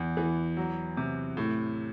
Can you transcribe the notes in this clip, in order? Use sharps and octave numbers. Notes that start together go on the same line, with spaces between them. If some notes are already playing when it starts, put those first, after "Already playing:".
Already playing: E2
E3
F#3
C3
A2